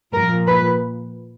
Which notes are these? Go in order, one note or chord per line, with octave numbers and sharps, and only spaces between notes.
A#2 F3 A#4
B4